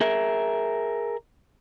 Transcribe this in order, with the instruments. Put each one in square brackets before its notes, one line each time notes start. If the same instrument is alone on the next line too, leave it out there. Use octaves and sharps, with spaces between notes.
[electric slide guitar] G#4 A#4 E5